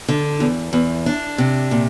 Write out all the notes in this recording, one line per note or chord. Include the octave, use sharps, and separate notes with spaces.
D3
E2
E2
D4
C3
A#2